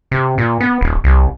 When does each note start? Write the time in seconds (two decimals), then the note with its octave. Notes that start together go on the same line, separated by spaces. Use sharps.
0.11 C3
0.38 A#2
0.60 B3
0.81 D#1
1.04 C2